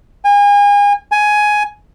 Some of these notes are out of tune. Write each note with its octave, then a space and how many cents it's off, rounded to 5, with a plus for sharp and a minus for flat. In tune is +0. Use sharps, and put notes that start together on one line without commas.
G#5 -35
G#5 +10